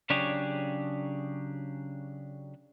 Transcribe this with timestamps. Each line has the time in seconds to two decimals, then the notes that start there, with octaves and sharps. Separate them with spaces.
0.10 C#3 F#3 D4 G4 G#4 C#5